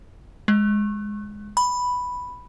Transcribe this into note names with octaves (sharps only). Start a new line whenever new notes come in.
G#3
B5